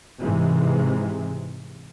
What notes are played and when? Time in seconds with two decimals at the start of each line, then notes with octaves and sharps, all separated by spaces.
0.20 G#2 C3 E3 G#3